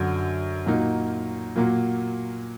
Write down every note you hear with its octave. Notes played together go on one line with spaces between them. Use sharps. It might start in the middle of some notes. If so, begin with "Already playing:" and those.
Already playing: F#2 D3 F#3
A#2 F#3 A#3 D#4
A#2 F#3 A#3